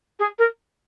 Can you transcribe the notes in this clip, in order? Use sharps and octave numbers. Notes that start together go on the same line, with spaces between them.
G#4
A#4